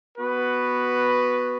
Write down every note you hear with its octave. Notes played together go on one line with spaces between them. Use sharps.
B3 F#4 B4